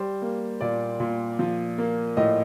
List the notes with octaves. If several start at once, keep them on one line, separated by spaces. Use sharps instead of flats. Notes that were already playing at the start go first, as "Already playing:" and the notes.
Already playing: G3 C5
A#3
A#2 D5
A#2
F3
A#3
A2 D#5